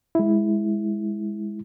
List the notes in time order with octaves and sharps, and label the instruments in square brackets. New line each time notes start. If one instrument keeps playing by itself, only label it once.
[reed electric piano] G#3 E4